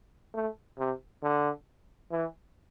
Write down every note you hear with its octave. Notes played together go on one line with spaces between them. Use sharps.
A3
C3
D3
E3